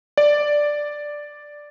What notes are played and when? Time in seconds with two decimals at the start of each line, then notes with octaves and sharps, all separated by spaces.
0.17 D5